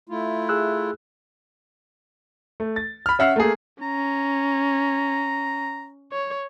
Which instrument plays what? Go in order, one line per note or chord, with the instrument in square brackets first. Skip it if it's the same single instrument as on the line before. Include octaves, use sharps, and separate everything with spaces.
[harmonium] A3 E4 F4
[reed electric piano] G#4 E6 F#6
[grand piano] A3
A6
B5 F6
C#4 E5 F#5 F6 C7
A3 A#3 G#4
[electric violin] C#4 [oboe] A#5
[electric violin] C#5